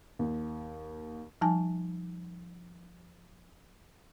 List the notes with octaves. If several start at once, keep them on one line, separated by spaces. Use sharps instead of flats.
D#2
F3 G3 D#4 G#5 A5